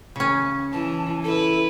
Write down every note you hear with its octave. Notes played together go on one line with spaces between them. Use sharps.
C#3 C#4
E3 A5
E4 A4 B4